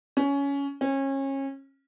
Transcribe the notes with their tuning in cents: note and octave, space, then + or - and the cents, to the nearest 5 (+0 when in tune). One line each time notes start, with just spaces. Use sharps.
C#4 +15
C#4 -30